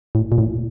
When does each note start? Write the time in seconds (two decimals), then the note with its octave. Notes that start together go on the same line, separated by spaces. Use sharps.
0.15 A2
0.32 A#2
0.38 A2